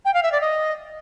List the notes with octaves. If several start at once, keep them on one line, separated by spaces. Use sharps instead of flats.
G5
F5
E5
D5
D#5